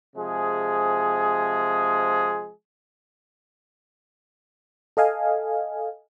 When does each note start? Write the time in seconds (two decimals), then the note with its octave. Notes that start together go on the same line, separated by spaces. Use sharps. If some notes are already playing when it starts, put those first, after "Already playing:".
0.16 C3 F3 G#3 G#4
4.97 A4 D#5 F5 G#5